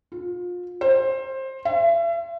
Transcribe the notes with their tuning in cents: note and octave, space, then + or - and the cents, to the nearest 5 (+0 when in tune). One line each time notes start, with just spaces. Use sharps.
F4 +30
C5 +20
E5 +40